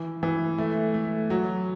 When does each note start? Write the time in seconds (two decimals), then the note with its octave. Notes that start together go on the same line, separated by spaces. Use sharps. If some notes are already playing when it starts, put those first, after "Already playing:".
Already playing: E3
0.23 E3
0.58 A3
0.94 A3
1.30 F#3